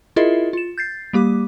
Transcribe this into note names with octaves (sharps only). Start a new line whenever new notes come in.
E4 F4 G#4 A#4 D#5 E5
F4 E7
G6 A6 C7
G3 A#3 G4 D6